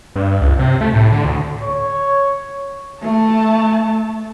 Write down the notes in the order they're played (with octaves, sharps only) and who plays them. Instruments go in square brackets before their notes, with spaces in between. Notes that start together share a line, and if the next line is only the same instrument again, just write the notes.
[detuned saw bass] G2
C#2
C3
A3
A2
D3
D2
[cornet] C#5
[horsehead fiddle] A3 A5